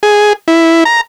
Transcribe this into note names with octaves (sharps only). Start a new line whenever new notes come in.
G#4
E4
A#5